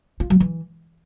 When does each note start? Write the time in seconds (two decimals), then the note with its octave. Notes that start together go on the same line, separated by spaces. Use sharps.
0.20 F4
0.30 F#3
0.40 E3